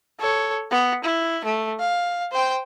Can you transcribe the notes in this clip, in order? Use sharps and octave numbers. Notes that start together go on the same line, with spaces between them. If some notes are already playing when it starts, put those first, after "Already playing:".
A4 C#5
B3
E4
A3
F5
C5 G5